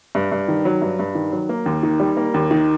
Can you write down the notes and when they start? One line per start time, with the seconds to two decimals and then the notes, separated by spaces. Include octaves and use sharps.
0.15 G2
0.32 G2
0.48 D#3
0.65 F#3
0.82 G2
0.99 G2
1.15 D#3
1.32 F#3
1.49 A#3
1.66 D#2
1.83 D#3
2.00 G3
2.17 A#3
2.34 D#2
2.51 D#3